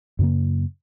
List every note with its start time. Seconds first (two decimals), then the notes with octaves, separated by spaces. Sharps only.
0.19 F#2 C#3 A#3